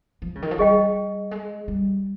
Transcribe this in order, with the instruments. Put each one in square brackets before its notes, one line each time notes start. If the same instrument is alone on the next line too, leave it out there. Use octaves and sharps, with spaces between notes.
[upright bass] F3
C#3
D#3
F3
[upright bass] G3 [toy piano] G#4 D#5 G5
[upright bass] G#3
G3